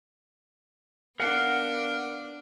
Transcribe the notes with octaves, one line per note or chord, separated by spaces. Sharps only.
B3 D4 A#4 F5 F#5